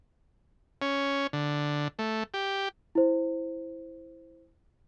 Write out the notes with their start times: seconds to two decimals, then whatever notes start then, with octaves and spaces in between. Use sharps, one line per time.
0.82 C#4
1.33 D3
1.99 A3
2.34 G4
2.95 E4 C5